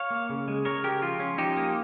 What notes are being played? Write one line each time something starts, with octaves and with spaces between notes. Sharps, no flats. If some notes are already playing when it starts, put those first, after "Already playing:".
Already playing: C#5 F5
A#3
C#3
G#3
C#3 A#4 C#5
G#3 G4 A#4
F3 F4
C#4
F3 D#4 G4
A#3